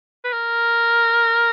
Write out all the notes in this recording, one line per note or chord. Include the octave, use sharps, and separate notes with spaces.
B4
A#4